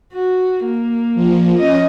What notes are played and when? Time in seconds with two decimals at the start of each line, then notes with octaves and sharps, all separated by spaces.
0.13 F#4
0.65 A#3
1.15 F3
1.58 C#4 D#5